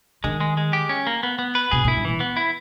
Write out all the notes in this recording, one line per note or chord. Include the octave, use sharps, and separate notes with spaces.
D#3 G#3
G#3
G#3
G4
C#4
A#3
B3
B3
B4
B2 G#4
A#2
E4
G2
A#2 E3
B3
E4